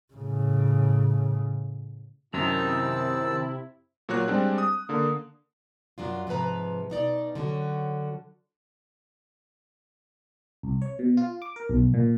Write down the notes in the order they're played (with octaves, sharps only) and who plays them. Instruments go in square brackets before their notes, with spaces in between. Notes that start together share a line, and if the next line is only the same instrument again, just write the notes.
[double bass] A2 C#3
[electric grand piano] F#2 [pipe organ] C3 E4 [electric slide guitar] D#3 A#5 [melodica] C4 A5 E6
[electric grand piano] A#2 F#3 F#4 C#5 F#6
G3 G#3 C4 D4
D#6
D3 A#3
[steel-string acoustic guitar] F#2 F#3 D4 F4
G#2 C3 F3 B4 A#5
B2 D#4 D5
D3 F#3 C#4 F#4
[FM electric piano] C2
C#5
B2
F4
D6
A#4
B1
A#2